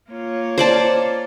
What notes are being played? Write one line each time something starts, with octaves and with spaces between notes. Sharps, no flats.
A#3 F4 C#5
C5 D5 A5